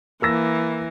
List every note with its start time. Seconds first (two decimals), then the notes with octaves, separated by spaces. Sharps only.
0.22 E3 A#3 E6 A#6